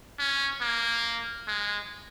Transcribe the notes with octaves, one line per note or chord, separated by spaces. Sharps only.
C#4
A#3
G#3